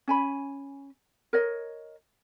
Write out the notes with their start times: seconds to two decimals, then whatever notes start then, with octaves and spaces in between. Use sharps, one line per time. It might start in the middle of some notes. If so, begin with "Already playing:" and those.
0.08 C#4 G#5 B5
1.33 A#4 C#5 D#5